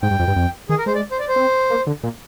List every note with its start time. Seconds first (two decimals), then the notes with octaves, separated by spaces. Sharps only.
0.02 G#2 G5
0.11 G2
0.19 F2
0.28 G2
0.36 F2
0.69 D#3 G#4
0.78 A#4
0.86 G#3 C5
0.95 D5
1.11 C5
1.19 D5
1.28 C5
1.36 C4
1.70 A#3
1.87 D3
2.04 A#2